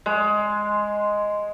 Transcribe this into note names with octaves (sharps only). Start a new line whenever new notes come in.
G#3